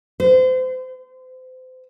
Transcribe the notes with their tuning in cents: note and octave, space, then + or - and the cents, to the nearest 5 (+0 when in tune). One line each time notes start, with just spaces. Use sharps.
C5 -35